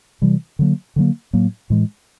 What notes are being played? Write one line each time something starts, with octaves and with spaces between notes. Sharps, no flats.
C3 E3 G3
D3 F#3 A#3
D3 F#3 A#3
A2 F#3 A#3
A2 E3 G#3